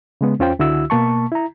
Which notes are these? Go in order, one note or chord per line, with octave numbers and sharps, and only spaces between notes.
C#3 G#3 B3
E2 C#4 F4 C5 G5
C#2 D3 E4 F#4 E6
B2 A#3 A5 C#6
E4 A#5